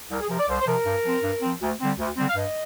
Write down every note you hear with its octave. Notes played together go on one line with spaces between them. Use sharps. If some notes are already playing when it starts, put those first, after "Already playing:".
C2 A#4
G#4
C3 F3 A#4
D5
C2 C5
C5
C3 F3 A#4
G2
F3 C4
G2
F3 C4
D2
D3 G3 C4
D2
D3 G3 C4
F5
G2 D#5